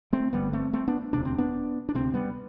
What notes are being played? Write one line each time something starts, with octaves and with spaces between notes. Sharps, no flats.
A3 C4
G1 F#2 D3 G3 B3
A3 C4
A3 C4
B3 D4
E1 D2 C3 D4
C4
B3 D4
D4
D2 C3 A3 C4
G3 B3